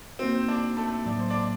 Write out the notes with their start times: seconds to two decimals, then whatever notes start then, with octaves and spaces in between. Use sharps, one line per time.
0.19 A#3 C4 D#4 F#4
0.48 D4
0.77 A3 A4
1.06 A2 F#3 A#3 D5
1.19 C5
1.30 D4 D5